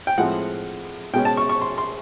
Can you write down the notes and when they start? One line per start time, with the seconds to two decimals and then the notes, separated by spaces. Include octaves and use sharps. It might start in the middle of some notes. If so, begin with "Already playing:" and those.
0.07 G5
0.18 A2 F3 G#3 C4 F#5
1.14 B2 G#3 C#4 G5
1.25 A5
1.37 C#6
1.49 C#6
1.62 C6
1.78 C6